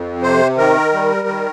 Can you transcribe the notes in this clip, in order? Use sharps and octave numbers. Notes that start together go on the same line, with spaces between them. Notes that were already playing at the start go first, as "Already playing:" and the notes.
Already playing: F2
C3 C5
D#3 A#4
G3
D#3